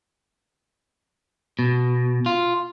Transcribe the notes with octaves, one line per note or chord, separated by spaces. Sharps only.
B2
F4